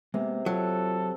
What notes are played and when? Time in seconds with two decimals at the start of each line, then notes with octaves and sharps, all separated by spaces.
0.14 C3 G#3 A#3 B3
0.46 F#3 F4 A4